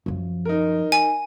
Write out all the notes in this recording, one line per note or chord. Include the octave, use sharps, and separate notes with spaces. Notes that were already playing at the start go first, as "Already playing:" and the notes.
F#2 F3
D#4 A#4
G#5